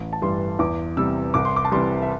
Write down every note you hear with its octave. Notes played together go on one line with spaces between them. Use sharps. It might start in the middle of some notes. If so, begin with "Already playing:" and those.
Already playing: A1
A5
G2 E3 G3 C6
E2 D6
C3 G3 E6
C2 D6
C6
D6
A5
C3 E3 G3 C6
E5